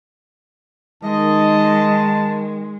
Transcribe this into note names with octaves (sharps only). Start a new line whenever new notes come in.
D#3 G#3 D#5 A5